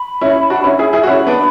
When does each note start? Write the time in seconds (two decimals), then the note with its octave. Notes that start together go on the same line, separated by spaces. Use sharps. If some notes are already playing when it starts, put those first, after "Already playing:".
Already playing: B5
0.21 C#4 E4
0.50 D4 F#4
0.64 C#4 E4
0.79 E4 G#4
0.93 E4 G#4
1.03 F#4
1.07 C#4 E4 B5
1.27 B3 D4